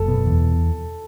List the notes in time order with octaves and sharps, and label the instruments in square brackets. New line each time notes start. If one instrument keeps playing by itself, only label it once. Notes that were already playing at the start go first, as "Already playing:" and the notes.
Already playing: [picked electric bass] F#1 [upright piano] A4
[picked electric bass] B2
E2